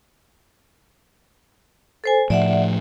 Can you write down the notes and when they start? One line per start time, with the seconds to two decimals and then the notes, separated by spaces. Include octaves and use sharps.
2.04 A4 C5 G#5
2.30 A2 F3 D5 E5 F#5